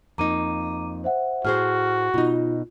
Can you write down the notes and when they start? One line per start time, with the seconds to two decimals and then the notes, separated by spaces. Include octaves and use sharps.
0.18 F2 A#3 D#4 A#5 D6 D#7
1.04 C5 E5 F#5
1.45 A2 F#4 G#4 C5 F6
2.14 B2 D#4 F4